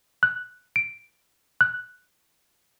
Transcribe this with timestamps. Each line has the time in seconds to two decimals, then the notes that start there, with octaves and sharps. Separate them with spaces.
0.23 F#6
0.76 D7
1.61 F#6